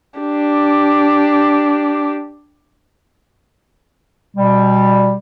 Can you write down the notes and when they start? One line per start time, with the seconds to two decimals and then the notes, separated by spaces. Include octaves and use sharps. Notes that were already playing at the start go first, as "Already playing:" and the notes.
0.20 D4 G4
4.35 B2 G3